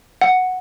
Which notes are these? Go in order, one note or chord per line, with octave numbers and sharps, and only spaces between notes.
F#5